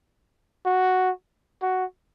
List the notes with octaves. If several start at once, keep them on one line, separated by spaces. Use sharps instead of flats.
F#4
F#4